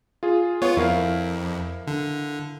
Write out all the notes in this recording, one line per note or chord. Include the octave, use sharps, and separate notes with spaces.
F4 G#4
B3 F4 C#5
F2 E4 A#4 F5
D3